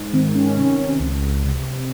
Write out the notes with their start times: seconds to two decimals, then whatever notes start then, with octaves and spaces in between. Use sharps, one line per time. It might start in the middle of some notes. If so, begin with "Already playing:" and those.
Already playing: G#2
0.13 D#3 C4
0.35 C#4
0.57 C3
1.00 C#2
1.44 C3